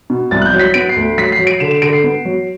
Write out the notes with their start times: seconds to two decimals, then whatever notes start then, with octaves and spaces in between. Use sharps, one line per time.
0.10 B2
0.31 C2 A6
0.42 F#6
0.45 G6
0.53 F#3
0.59 B6
0.74 B3 D7
0.89 C7
0.96 D2
1.18 F#3 B6
1.32 C7
1.39 F#3
1.47 D7
1.60 D3 E7
1.71 E7
1.82 D3 D7
1.93 C7
2.04 B3
2.25 F#3